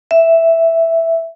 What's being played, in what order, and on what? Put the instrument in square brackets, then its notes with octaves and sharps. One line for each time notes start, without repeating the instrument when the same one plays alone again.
[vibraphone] E5